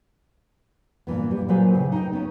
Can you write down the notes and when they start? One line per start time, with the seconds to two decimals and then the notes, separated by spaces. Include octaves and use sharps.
1.07 G2 A#2 E3 B3
1.31 G3
1.48 A#2 F#3 F4 B4 C5 G#5
1.74 A2 C#3
1.92 D#4 G5
2.13 B3 C#4